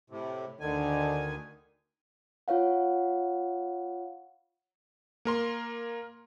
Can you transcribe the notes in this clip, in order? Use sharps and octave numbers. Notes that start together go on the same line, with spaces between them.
A2 C3
D2 D3 D#3 G#5
F4 C#5 F5 F#5
A#3 A#4 C6